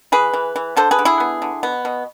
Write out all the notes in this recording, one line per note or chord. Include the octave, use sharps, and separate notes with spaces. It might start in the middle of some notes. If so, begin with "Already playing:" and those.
E3 G#4 B4
E3
E3
D3 A4 C5
G#4 B4
D3
E4 G#4
B3
D3
B2 B3
B2